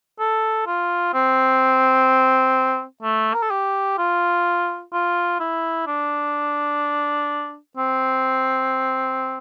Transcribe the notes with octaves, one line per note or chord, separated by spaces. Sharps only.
A4
F4
C4
A3
A#4
A4
G4
F4
F4
E4
D4
C4